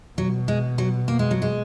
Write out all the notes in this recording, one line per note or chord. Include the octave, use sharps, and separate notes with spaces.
B2 F#3
G#3
F#3
A#3
G#3
F#3
G#3